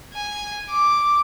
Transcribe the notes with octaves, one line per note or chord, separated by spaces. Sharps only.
G#5
D6